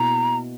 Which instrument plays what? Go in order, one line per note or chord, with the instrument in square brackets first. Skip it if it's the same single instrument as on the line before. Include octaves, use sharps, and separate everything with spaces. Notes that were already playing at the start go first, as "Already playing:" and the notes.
Already playing: [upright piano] B2 A#3 E4 [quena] A#5